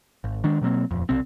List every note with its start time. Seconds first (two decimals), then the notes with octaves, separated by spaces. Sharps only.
0.24 G#1
0.44 D#3 G#3 D4
0.61 B2 F#3 A#3 C4
0.91 D#1 F2
1.09 B1 C3 C4